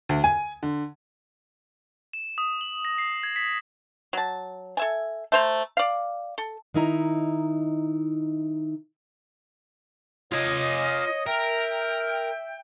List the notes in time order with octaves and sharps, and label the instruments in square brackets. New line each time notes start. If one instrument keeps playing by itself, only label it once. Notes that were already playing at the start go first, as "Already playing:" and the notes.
[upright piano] D2
G#5
D3
[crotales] E7
D#6
F#7
A#6
C7
G#6
B6
[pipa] F#3 A5
A4 E5 G#5
A3 C5 A#5
D5 F5
A4
[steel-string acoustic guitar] D#3 D#4 E4 A#5
[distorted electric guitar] F4 G#5 [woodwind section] C#5 D#5
[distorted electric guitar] A#4 [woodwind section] E5 G5